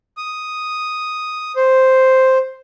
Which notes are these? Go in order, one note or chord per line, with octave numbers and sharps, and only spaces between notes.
D#6
C5